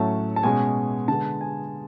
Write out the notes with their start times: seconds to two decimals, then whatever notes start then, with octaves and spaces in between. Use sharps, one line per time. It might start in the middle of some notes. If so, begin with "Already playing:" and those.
Already playing: A2 F#3 A3 C#4 A5
0.36 A5
0.43 B2 G#3 C#4 G#5
1.08 D3 G#3 B3 A5
1.41 G#5